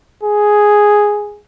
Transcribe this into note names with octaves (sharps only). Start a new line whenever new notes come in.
G#4